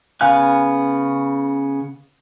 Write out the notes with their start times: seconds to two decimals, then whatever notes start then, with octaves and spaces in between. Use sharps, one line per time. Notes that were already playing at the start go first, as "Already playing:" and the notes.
0.21 C#3 B3 F5 G#5 F#6